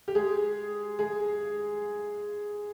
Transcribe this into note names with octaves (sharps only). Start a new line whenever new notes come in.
G4
G#3 G#4
G#3 G#4